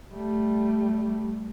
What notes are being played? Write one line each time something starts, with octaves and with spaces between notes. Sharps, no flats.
G3 A3